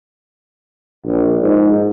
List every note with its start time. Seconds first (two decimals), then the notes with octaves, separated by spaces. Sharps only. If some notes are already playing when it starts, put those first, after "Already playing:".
1.04 A#1
1.41 G#2